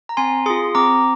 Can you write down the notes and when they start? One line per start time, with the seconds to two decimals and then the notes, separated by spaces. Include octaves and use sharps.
0.09 A#5
0.17 C4 G#5 C6
0.46 G#4 C6 D#6
0.50 F4
0.75 C4 A#5 D6